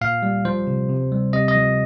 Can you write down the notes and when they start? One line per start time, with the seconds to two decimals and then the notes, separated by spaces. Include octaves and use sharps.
0.01 A#2 F5
0.23 G3
0.45 F3 C5
0.67 C3
0.89 C3
1.12 G3
1.33 C3 D#5
1.48 D#5
1.56 F3